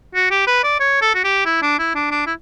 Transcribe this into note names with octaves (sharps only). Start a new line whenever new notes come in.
F#4
G4
B4
D5
C#5
A4
F#4
G4
E4
D4
E4
D4
D4
E4